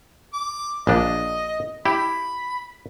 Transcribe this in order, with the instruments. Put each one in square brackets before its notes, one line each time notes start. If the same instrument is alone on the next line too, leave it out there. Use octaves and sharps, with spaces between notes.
[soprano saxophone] D6
[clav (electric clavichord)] A#1 D4 [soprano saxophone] D#5
[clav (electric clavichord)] E4 G4 [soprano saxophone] B5